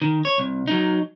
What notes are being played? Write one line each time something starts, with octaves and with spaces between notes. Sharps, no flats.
D#3
C#5
C2
F#3 D#4